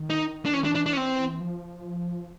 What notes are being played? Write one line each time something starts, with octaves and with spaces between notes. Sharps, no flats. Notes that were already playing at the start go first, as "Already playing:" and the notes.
Already playing: D#3
D#4
D4
E3 C#4
D#3 D4
E3
D4
D4
C#4
C4
F3